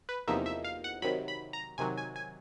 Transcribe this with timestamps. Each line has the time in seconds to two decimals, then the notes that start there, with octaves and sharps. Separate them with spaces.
0.09 B4
0.28 E2 C3 F3 A#3 D#4 E5
0.46 E5
0.64 F5
0.84 F#5
1.02 C3 D#3 F#3 B5
1.28 B5
1.53 A#5
1.78 C3 D#3 F#3 G#5
1.98 G#5
2.16 G#5